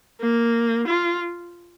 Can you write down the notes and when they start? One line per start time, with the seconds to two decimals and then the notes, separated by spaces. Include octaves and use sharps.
0.21 A#3
0.88 F4